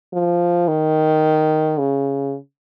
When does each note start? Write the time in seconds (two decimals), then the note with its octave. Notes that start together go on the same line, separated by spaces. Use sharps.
0.13 F3
0.68 D#3
1.78 C#3